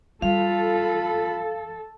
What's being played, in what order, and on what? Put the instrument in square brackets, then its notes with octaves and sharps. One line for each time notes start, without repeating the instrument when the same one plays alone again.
[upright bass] G3 [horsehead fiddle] F4 B5 [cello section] A4 [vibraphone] F5